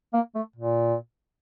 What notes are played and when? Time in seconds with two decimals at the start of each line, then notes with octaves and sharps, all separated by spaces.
0.13 A#3
0.35 A3
0.56 A#2